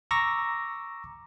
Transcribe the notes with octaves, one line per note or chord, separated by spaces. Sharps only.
A#5 C#6 D6 E6 A#6